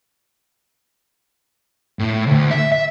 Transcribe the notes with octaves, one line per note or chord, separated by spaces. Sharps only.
A2
D2
E5
E5